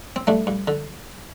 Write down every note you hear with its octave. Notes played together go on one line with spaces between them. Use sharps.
C4
G2 A3 D4
G2
D3